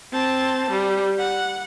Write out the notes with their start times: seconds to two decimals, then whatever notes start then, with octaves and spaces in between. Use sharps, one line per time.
0.12 C4 A5
0.70 G3
1.19 F#5